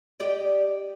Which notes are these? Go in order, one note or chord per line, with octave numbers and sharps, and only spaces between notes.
G4 D5 D#5